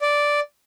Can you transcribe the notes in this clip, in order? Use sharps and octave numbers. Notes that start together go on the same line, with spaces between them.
D5